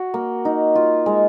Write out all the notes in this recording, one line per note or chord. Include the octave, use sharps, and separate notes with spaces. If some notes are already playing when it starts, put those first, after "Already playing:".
Already playing: F#4
A#3
D#4
F4
G#3